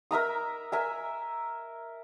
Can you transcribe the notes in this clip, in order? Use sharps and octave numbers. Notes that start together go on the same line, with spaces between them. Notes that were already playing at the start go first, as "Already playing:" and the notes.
A#4 E5 A#5 D#6
A#4 E5 G#5